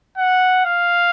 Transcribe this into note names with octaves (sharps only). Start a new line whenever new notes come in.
F#5
F5